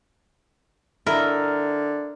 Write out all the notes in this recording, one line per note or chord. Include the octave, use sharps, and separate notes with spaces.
D3 E4 A#4 D#5 E5